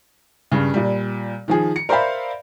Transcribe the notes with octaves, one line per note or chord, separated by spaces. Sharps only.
G2 C#3
A#2 G3
D#3 F3 G#4
C#7
A#4 C5 D5 E5 F5 B5